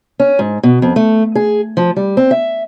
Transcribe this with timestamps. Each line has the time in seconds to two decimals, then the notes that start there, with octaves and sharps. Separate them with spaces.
0.19 C#4
0.39 G#2
0.63 B2
0.82 F2
0.96 A3
1.35 G#4
1.77 F3
1.96 G3
2.17 C4
2.31 E5